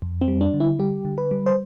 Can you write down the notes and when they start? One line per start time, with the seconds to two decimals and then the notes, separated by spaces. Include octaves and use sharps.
0.02 F2
0.21 C4
0.28 G3
0.41 D4
0.53 D3
0.60 E4
0.79 G3 G4
1.05 D3
1.18 B4
1.31 G3
1.46 C5